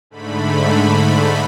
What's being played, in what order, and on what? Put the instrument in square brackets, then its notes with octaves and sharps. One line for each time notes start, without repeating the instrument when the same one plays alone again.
[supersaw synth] G#2 D3 A3 B5